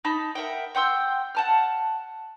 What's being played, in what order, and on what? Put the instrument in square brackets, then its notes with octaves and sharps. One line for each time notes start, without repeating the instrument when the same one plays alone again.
[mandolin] D#4 A5 B5
A#4 E5 F#5 G5
F#5 G5 C6 E6
F#5 A5 F6